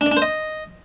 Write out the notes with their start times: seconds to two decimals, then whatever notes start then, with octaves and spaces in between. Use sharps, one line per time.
0.01 D4
0.06 D5
0.11 D4
0.17 C5
0.22 D#5